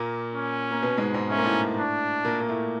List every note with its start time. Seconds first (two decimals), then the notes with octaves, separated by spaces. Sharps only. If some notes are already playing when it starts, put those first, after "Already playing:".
Already playing: A#2 A#3
0.34 C#4
0.71 A#3
0.82 B2 B3
0.97 G#2 G#3
1.14 G#2 G#3
1.30 A3 C#4
1.37 A#3
1.44 A2 A3
1.78 D4
2.25 A#2 A#3
2.40 A#3
2.48 A2 A3